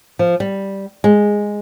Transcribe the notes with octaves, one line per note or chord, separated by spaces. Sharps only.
F3
G3
G#3